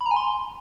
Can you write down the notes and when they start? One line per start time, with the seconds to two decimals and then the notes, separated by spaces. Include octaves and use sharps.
0.01 B5
0.06 A#5
0.11 G#5
0.16 C6